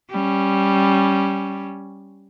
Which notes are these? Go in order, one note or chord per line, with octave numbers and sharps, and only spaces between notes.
G3 C#4